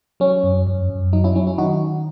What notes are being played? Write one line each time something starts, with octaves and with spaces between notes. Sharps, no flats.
F#3 C#4
F#2
F#2
F#2
F#3 D#4
C#4 E4
F#3 C#4
C#4 E4
D#3 D#4 F#4